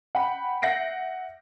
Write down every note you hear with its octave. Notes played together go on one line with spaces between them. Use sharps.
F#5 G5 B5
E5 F#5 G6 A#6 C7 D7